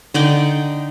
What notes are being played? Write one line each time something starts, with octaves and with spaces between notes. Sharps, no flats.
D3 D#4 D5 G5